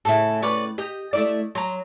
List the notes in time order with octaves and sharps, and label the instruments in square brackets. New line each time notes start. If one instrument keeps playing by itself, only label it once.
[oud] A2 C#3 [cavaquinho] E4 A4
[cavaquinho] B4 C#5 D5
[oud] G4 [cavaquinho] D#5
[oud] A3 E4 D5
[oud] F#3 [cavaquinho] A#5 C6